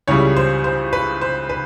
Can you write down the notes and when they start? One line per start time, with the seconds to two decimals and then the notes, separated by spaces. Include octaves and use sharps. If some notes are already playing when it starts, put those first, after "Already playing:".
0.08 C#2 C#3 E3 G3 C#5
0.37 C5
0.64 C5
0.93 B4
1.21 C5
1.49 B4